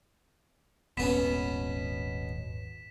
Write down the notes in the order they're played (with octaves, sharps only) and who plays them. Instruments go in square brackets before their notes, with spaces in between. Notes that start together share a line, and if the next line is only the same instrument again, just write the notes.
[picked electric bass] D#1 G#1 [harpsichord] B2 B3 C#4 [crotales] B6 E7